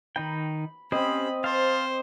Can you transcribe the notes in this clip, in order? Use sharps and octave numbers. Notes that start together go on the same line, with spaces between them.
D#3 D#4 G5 B5
C4 C#4 G4 C5 D#5 B5
C5 F5 A5